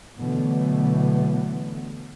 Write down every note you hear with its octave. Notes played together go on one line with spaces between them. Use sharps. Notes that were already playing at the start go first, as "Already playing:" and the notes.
B2 D3 E3 F#3 A3 B3